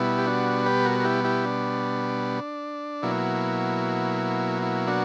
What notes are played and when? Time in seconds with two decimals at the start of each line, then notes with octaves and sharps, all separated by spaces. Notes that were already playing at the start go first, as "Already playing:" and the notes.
Already playing: B2 G3 B3 E4
0.18 G4
0.26 D4 F#4
0.66 G4 B4
0.85 F#4 A#4
1.00 A#4
1.04 E4 G4
1.24 E4 G4
1.45 D4
3.03 B2 F#3 A#3 E4
4.62 E4
4.87 D4 F#4